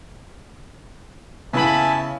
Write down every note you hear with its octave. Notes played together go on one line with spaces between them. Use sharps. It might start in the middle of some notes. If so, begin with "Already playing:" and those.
C#3 B3 E4 E5 G#5 A5 B5